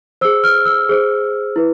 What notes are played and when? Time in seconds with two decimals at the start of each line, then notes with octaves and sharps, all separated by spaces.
0.21 C5 E6
0.25 G#4
0.44 F6
0.66 E6
0.89 G#4 C5
1.56 E4 B4